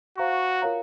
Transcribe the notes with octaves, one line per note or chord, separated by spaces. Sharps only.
F#4 C5 F5 A#5 C#6
F4 A#4 C#5 F5 A#5